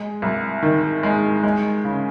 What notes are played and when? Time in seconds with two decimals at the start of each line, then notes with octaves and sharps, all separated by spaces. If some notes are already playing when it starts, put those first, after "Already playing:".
Already playing: G#3
0.22 C2
0.63 D#3
1.03 G#3
1.43 G#3
1.84 C#3